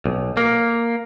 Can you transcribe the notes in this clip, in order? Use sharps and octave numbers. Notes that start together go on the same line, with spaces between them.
B1
A#3